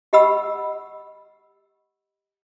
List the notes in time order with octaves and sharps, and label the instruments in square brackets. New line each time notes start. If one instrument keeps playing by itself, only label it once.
[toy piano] G4 D#5 F#5 B5 E6